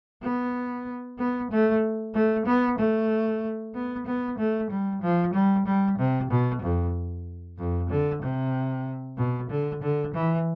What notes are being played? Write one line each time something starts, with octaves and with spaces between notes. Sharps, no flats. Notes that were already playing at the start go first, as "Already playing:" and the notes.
B3
B3
A3
A3
B3
A3
B3
B3
A3
G3
F3
G3
G3
C3
B2
F2
F2
D3
C3
B2
D3
D3
E3